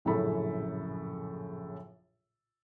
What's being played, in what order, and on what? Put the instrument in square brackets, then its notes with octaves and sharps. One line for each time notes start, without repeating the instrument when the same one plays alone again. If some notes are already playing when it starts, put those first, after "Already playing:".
[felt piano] A#1 F#2 A2 C#3 A4 B5